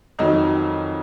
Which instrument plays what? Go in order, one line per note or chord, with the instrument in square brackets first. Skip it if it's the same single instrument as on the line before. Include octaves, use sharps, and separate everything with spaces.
[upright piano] F2 D#3 F#3 D#4